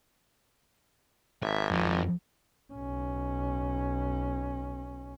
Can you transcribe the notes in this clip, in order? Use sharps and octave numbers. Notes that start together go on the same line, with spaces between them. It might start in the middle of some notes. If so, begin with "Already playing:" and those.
G#1 E5
F2
B1 C#4